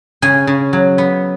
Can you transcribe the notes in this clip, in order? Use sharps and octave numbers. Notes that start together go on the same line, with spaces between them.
C#3 G#5
C#3
F#3
B3